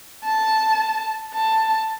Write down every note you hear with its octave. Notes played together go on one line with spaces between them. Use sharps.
A5
A5